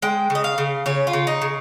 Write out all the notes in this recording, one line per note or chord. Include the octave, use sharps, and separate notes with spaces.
G#3 G5
C#3
D#5
F5
C#3
C#3 C#5
F4
C#3
D#4
C#3